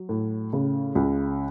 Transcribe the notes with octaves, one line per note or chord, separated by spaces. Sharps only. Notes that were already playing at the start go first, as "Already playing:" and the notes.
Already playing: F#3
A2
C#3
C#2